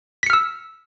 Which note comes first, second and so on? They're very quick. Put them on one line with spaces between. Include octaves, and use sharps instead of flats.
B6 C#7 F6 E6